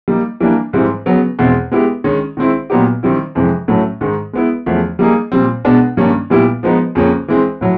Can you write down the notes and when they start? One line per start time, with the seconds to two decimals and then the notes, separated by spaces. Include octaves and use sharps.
0.08 G3 A#3 D#4
0.40 E3 G3 A#3 D4
0.73 G#2 E3 G3 C4
1.06 C#3 F#3 B3
1.39 E2 B2 G#3 C4
1.72 G#3 B3 E4 G4
2.04 D#3 G#3 C#4
2.37 D#3 G#3 C4 E4
2.70 A#2 F#3 B3 D#4 G4
3.03 D#3 G3 C4 E4
3.35 F2 C3 E3 G#3
3.68 A2 F#3 A3 C#4
4.01 G#2 D#3 G#3
4.33 G#3 B3 E4
4.66 E2 C#3 F3 A3
4.99 G3 A#3 D#4 G#4
5.32 A#2 G3 C4
5.65 B2 G#3 B3 D4
5.97 G2 D#3 G3 A#3 C#4
6.30 A#2 G3 B3 E4 G4
6.63 F3 G#3 B3 D#4
6.95 F2 C#3 F3 A#3 C#4
7.28 E3 G#3 C4
7.61 A2 F#3